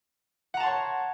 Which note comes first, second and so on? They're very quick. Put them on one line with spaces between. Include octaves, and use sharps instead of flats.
F#5 A#5 A5 C6 C#5